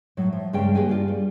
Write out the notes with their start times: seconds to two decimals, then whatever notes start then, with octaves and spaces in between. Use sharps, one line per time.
0.17 A2 F#3
0.32 F3
0.53 G2 C#3 G#3 C#4 G5
0.75 A#3 G4 G#4 B4 G5 G#5
0.89 G2 F4
1.08 G3